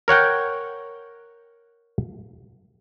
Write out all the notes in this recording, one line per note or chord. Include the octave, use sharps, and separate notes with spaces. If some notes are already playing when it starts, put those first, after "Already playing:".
A#4 C#5 F#5 G5